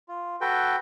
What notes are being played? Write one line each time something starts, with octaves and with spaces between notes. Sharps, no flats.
F4
F#4 A4 B4 G5